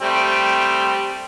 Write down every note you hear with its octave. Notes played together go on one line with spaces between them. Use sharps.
G3 A3 C4